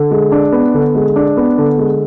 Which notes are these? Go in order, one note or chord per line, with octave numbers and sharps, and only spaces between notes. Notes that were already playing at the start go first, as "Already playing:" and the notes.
Already playing: D3
G#3
D4
B3
D3
G#3
D4
B3
D3
G#3